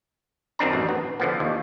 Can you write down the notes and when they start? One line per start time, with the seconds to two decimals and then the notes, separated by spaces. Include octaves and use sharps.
0.59 F#2 D#3 C4 D4 A#5
0.73 A1
0.89 B3
1.20 D3 F3 B3
1.40 D#2